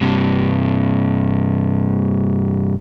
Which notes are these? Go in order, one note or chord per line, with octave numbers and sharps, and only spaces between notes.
G2 C3